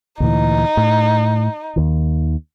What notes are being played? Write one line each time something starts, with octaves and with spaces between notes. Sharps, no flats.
D2 A#2 E3 D#4
A2
D#2 D#3